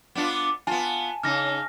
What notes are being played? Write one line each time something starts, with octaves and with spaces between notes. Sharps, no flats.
B3 D4 F4
B3 F4 G#5 A5
C#3 D#4 F6 A#6